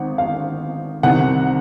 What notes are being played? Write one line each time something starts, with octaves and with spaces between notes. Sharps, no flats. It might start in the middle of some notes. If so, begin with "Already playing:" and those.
Already playing: G#1 D#3 F#5
F5
C2 C3 D#3 F#5